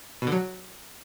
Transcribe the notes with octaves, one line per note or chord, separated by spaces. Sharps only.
B2
D3
F#3